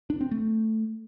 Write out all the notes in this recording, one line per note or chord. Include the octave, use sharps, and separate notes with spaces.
D4
C4
A3